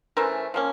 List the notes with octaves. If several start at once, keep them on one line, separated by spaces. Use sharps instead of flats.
E3 A3 C#4 A#4 C5
F3 A#3 C#4